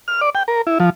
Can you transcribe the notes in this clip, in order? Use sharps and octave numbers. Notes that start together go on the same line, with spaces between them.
F6
D5
G5
A#4
E4
F3